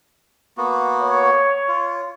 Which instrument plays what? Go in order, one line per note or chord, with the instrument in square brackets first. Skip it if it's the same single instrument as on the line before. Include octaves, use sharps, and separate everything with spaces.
[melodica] A#3 B3 F#4
[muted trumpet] C#5
[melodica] F4